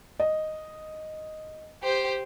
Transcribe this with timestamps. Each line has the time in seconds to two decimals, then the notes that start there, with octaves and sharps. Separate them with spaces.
0.20 D#5
1.83 G4 C5